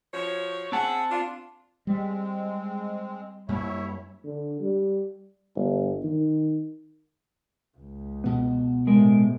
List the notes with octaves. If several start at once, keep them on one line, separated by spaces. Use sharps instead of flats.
F3 F#4 C#5
C4 G#4 E5 F#5 A5
D4 F4
G3 G#3 C4
F#2 G3 A#3 E4 C#5 E5
D3
G3
G1
D#3
C#2
B2 B3
A2 C3 G#3 A#4